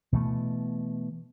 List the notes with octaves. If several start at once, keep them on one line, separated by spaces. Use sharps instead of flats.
B2 E3 A3